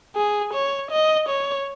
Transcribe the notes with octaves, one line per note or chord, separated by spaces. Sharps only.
G#4
C#5
D#5
C#5